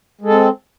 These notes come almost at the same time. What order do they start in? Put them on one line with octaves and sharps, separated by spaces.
G#3 A4 C4